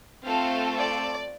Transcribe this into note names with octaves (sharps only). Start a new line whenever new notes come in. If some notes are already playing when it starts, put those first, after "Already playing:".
A3 C4 F4 A4 F5
D5